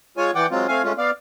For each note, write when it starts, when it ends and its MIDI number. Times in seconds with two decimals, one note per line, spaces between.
0.17 0.31 56
0.17 0.31 65
0.17 0.31 73
0.17 0.31 80
0.35 0.46 52
0.35 0.46 74
0.35 0.46 78
0.35 0.46 79
0.51 0.67 54
0.51 0.67 56
0.51 0.67 60
0.51 0.67 65
0.68 0.82 57
0.68 0.82 60
0.68 0.82 77
0.68 0.82 80
0.84 0.93 56
0.84 0.93 57
0.84 0.93 61
0.84 0.93 65
0.98 1.11 59
0.98 1.11 74
0.98 1.11 77